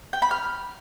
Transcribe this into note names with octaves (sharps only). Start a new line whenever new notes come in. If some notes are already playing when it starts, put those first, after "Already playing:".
G5
B5
F6